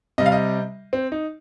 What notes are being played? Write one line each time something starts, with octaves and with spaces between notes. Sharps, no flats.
C3 G3 D#5
F5
D#5
C4
D#4